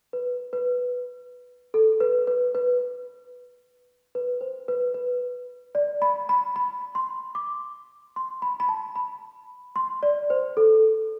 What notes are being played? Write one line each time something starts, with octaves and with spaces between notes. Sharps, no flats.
B4
B4
A4
B4
B4
B4
B4
C5
B4
B4
D5
B5
B5
B5
C6
D6
C6
B5
B5
A5
B5
C6
D5
C5
A4